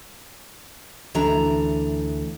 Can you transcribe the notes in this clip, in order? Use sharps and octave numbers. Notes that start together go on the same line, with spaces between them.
D2 E3 D4 A#5